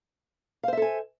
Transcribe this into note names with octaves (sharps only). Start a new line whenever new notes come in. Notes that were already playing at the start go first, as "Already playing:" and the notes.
A4 C5 E5 F5 G#5